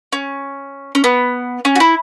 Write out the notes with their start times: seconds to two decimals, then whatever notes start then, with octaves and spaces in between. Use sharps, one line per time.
0.13 C#4
0.95 C#4
1.04 B3
1.65 C#4
1.76 F#4
1.80 E4